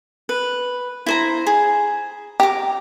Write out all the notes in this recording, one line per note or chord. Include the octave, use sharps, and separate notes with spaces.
B4
E4 C5 A#5
G#4
G4 A#5 D6